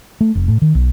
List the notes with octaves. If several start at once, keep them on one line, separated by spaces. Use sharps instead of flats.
A3
F1
A2
D#3
B1